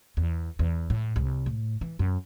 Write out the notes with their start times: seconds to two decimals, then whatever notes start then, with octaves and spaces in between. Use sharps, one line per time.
0.17 E2
0.59 E2
0.90 A2
1.16 C2
1.46 A2
1.81 E3
1.99 F#2